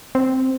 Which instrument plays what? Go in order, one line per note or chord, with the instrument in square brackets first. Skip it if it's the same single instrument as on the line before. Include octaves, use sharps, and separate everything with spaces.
[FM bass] C4